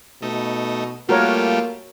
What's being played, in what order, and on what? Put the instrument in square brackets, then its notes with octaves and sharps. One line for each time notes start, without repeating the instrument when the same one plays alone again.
[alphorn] B2 [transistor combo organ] A3 D#4
[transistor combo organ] G3 A3 F4 [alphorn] A#3 [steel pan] F#4 A#4 C#5